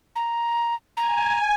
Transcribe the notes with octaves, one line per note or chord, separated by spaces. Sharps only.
A#5
G#5 A#5